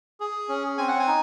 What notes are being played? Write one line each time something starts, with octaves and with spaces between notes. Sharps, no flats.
G#4
C#4
C4 G#5
F#5
G#5
D#4